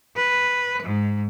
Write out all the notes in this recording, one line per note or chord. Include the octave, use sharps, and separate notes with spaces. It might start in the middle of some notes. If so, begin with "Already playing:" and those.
B4
G#2